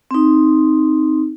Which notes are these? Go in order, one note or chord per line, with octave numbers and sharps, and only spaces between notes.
C4 D#4